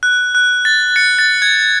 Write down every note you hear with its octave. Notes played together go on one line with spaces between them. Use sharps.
F#6
F#6
A6
A6 C#7
A6
G#6